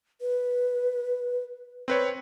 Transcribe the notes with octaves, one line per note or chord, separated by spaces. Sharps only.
B4
C4 B4 C#5